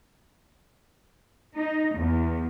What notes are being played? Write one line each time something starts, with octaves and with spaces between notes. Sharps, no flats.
D#4
E2